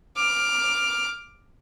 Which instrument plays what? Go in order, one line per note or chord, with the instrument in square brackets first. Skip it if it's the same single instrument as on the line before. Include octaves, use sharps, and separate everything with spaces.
[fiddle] D6 F6